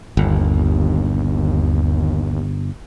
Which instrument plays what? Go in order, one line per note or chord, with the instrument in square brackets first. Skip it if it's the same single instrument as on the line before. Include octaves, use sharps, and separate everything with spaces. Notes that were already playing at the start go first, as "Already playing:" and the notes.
[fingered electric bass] G1 [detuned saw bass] D#2